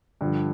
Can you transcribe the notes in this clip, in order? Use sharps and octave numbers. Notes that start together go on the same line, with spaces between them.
G2 D3 F3